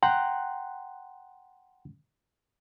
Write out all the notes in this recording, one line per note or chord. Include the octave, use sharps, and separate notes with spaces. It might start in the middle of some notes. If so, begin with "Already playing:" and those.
F#5 G5 A#5 C6 F#6